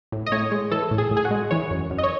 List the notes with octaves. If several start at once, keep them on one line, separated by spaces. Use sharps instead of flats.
A2
D#5
A2 C#5
G#3
E3 A4
A2
G#4
A2
G#4
F#4
G#3
E3 C#5
F#2
F#2
D#5
C#5